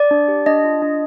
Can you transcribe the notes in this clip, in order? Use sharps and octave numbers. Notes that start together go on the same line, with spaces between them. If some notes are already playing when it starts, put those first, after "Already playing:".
Already playing: D5
D4
G4
D4 D#5
F4
D4